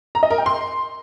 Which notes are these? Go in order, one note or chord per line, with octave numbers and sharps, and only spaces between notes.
A#5
D#5
A#4
G5
C6